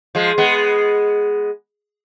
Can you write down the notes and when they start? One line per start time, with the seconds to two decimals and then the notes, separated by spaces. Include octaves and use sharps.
0.15 F3 G#3
0.38 G#3 B3